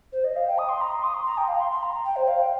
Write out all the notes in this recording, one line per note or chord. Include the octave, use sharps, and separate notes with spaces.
C5
D#5
F5
G5
D#6
C6
A#5
C6
D#6
C6
A#5
G5
F5
A#5
C6
C6
A#5
G5
C5
F5
G5